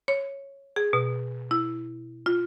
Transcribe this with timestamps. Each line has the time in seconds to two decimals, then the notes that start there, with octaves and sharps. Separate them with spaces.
0.08 C#5
0.76 G#4
0.93 B2
1.51 E4
2.26 F4